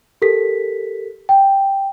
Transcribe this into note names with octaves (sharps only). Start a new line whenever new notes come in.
G4 A4 A#4 B6
G5